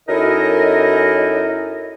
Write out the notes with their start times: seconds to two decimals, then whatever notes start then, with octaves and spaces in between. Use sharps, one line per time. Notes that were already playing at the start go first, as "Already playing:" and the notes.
0.08 F#2 D#4 E4 A4 A#4 D#5